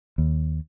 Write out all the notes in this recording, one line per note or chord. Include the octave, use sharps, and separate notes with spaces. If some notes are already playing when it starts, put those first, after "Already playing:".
D#2